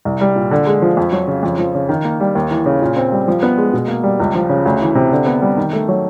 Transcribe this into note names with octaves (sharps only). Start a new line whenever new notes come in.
C2
G3
A#2
D3
G#3
F3
F2
F#3
C#3
F2
F3
C#3
D#3
A#3
G3
D#2
E3
C#3
A#2
C4
G3
F3
B3
G#3
B2
A#3
G3
C#2
F3
C#3
D2
E3
C3
D3
B3
G3
D#3
A3
F#3